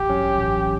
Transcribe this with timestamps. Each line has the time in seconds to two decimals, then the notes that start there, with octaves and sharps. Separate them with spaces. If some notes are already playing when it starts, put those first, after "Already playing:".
Already playing: A1 G4
0.10 G2 F#3 C#4
0.38 A1